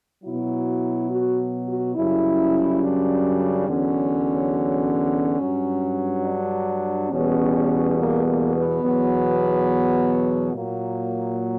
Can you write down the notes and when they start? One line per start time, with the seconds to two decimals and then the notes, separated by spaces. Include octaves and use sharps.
0.23 B2 F#3 E4
1.09 F#4
1.66 F#4
1.95 F#2 C#3 G3 E4
2.81 D4
3.67 E2 D3 F#3 C#4
5.39 G2 F#3
6.25 D4
7.10 E2 B2 G3 C#4
7.97 A#3
8.25 A#3
8.54 B3
8.82 E2 B2 F#3
10.53 A#2 F#3 A#3